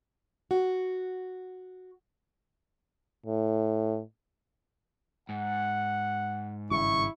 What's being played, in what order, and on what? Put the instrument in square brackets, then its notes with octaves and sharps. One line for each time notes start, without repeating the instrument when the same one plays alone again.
[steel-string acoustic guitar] F#4
[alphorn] A2
[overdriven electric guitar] G#2 [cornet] F#5
[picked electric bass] G#1 G2 C#3 [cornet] E4 [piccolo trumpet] C#6